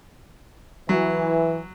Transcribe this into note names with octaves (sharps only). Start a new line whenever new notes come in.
E3 F#3